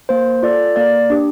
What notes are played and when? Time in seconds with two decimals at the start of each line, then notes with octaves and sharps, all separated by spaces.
0.09 A#3 C5
0.43 F4 A4 D5
0.76 A#3 D5
1.10 D4 G4